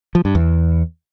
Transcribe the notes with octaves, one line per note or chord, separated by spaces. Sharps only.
F3
G2
E2